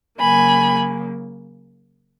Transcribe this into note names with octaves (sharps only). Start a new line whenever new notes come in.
C#3 F#3 A#3 G#5 B5